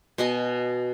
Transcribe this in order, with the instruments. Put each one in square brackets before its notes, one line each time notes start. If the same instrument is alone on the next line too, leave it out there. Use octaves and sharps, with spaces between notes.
[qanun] B2 D#5 G#5